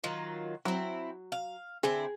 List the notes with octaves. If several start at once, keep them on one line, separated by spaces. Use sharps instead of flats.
D#3 F#3 F4
F#3 C4 E4
F5
D3 C4 E4 G#4